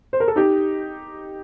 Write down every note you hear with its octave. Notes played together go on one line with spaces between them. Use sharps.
C5
A#4
A4
D#4 G4